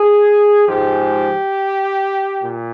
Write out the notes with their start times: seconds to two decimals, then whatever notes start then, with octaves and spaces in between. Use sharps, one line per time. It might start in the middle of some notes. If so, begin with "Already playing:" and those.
Already playing: G#4
0.68 G#2 F3 G#3 G4
2.42 A#2